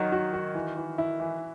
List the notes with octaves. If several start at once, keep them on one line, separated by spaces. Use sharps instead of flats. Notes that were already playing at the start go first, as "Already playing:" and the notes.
Already playing: D#3 F#3 F#4
F#4
F#4
E3
E3
E4
E3